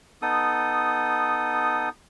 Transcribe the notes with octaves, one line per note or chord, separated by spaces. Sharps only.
B3 D#4 A4 D#6